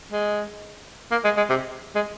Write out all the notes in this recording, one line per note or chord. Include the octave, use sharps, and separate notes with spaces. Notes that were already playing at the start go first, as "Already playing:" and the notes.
G#3
A#3
G#3
G#3
C3
G#3